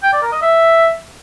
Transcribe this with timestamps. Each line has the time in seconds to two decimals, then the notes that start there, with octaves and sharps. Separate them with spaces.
0.03 G5
0.13 D5
0.22 A#4
0.32 D#5
0.42 E5